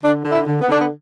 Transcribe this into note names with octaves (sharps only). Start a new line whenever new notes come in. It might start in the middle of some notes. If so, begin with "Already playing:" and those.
D3 D4
D3
E4
D3
B3
D3 D4
B3